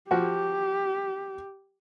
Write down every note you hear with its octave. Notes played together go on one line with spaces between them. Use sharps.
F3 F#4 G4